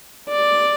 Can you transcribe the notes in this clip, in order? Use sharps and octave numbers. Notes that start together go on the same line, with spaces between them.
D5